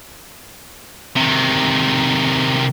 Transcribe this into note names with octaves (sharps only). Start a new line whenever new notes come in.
C3 D#3